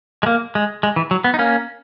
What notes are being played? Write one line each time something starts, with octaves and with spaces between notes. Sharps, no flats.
G#3
A#3
G#3
G#3
E3
F#3
B3
D#4
A#3 C#4